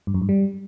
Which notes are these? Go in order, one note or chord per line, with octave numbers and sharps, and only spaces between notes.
G2
F#2
G2
G3